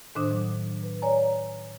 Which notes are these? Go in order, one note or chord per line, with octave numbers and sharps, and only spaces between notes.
A2 D#3 D4 C5 D#6
F#3
B4
C#5 D5 G#5 A#5